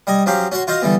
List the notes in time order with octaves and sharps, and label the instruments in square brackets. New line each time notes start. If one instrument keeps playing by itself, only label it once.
[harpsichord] G3 D#5 G#5
F3 F#3 C#4 G4 F5
C#4 F#4 C#5 F#5 C6
F4 F#4 C5 D#5 F5
D3 E3 G3 B3